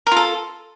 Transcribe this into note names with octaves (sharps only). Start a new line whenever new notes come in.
F4 A4 A#4